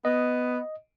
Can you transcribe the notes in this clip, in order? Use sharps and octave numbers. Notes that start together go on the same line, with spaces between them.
B3 D#5